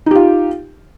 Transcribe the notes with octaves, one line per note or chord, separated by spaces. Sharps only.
D#4 F4 G4